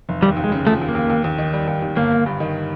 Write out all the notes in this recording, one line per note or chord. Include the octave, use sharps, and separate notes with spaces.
F1
D#2 G3
D#2
G#3
C#3
F3 A3
D#2
A#3
D#2
D#2
D#2
D#3
G3
D#2
D#2
G1 A#3
G1
G2
D#3